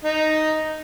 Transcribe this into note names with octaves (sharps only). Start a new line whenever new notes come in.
D#4